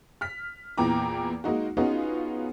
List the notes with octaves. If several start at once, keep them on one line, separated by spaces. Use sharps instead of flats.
F6 B6
E2 A#2 E3 G5 A#5 D6
G#3 A#3 D#4 F#4
B3 C#4 D#4 F4 F#4 G#4